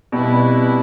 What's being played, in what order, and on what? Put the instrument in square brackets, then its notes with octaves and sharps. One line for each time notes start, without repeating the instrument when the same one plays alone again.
[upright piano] B2 [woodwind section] G3 C4 E4 B4